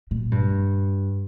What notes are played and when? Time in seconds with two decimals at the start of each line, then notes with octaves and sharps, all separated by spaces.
0.11 A#2
0.32 G2